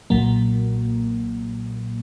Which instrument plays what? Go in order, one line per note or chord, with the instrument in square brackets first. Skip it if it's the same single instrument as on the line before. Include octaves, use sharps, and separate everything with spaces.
[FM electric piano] B1 A#2 F#3 A#3